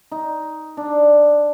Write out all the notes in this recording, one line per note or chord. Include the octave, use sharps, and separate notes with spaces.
D#4
D4